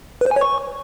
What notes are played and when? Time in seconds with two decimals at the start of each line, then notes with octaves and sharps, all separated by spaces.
0.21 B4
0.26 C5
0.31 G#5
0.36 C#5
0.41 C#6